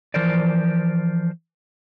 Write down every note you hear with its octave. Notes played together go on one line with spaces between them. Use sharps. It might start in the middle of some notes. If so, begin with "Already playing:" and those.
E3 F3 A#4 C5 D5